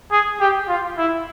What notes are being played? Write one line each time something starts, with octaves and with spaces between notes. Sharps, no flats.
G#4
G4
F4
E4